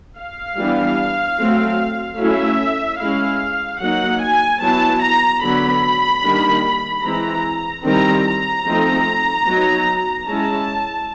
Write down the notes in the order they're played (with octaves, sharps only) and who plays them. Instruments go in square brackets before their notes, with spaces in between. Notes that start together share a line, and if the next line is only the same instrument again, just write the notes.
[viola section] F5
E3 G3 B3 D4
F#3 A3 C4
F#3 A3 C#4 E4 E5
G#3 C#4 E4 F5
F#3 A#3 D#4 F#5
G#5
F#3 B3 E4 A5
A#5
D3 F#3 B3 B5
D#3 G3 A#3 D4
E3 G#3 C4 E4 A#5
D#3 G3 C4 E4 A#5
A#5
F3 A3 C4 D#4
F#3 B3 D#4
G#3 C#4 E4 A5